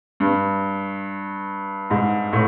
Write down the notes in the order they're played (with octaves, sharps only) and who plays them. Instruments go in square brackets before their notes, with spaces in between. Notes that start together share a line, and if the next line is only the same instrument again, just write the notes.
[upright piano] G2
G#2
A2